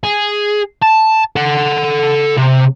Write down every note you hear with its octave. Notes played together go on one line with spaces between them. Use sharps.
G#4
A5
A4 F#5
C3